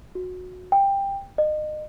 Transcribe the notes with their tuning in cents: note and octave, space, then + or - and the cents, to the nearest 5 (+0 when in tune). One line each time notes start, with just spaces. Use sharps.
F#4 -20
G5 +15
D#5 -30